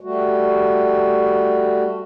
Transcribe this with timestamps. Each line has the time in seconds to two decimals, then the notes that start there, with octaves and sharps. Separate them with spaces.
0.01 G3 A3 F#4